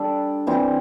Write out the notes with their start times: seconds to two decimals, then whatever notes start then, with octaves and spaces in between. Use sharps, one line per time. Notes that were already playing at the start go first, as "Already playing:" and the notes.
Already playing: G3 D4 A4 D5
0.47 E3 G3 C4 G4